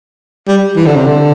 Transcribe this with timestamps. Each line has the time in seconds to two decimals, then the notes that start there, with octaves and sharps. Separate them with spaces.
0.48 G3
0.76 E3
0.86 D3
0.96 C3
1.06 D3